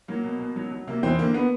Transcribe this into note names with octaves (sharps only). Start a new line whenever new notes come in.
F#3 A#3
B2
B2
F#3
F#3
C3 A#3
E2 C4
D3 A#3
B3